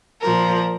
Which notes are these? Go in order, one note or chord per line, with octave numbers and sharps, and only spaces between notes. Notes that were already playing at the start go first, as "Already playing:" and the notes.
A#2 F3 A#4